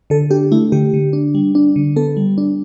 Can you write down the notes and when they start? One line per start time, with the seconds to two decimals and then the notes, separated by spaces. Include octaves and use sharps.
0.10 D3 A4
0.31 D4 G4
0.52 A3 E4
0.72 D3 G4
0.94 D3
1.13 D4
1.35 G3
1.55 D4
1.76 D3
1.96 B3 A4
2.17 G3
2.38 D4